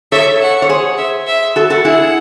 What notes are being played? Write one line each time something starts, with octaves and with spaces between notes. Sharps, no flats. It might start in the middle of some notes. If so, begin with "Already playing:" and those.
A4 C#5 E5
F#5
C#5
G#4 C5
E5
E5
F#4 A4
F#4 A4
E4 G#4 F#5